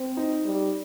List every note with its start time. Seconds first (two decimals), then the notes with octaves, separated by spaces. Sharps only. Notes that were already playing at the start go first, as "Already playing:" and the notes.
Already playing: C4
0.17 D#4
0.45 G3